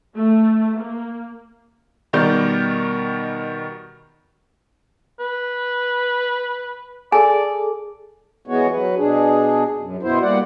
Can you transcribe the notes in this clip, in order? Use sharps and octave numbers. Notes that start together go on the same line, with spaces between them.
A3
A#3
B2 D#3 G3 A#4 D5 G6
B4
G#4 A4 D5 G#5
E3 G#3 B3 F#4 C#5
F#3 B4
B2 D4 G#4
F#2
B2 B3 E4 C5
G3 A#3 D5 F#5